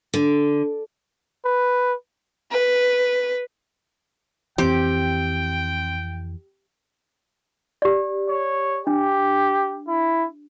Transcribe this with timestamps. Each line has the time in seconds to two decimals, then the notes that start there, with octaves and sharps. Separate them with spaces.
0.14 D3
1.45 B4
2.51 B4
4.58 F2 E3 C4 G4 G5
7.82 G4 D5
8.29 C#5
8.87 D4 G4
9.87 E4